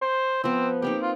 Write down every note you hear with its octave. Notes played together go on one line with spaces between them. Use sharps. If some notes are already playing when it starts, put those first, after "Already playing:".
C5
F3 B3 C4
A#3 C4 D#4 G4
F4